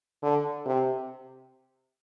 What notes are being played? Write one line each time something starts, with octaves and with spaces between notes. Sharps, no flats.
D3
C3